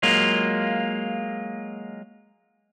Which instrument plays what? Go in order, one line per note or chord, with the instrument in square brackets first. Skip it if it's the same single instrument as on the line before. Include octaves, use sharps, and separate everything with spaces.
[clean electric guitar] F#3 G#3 A#3 F4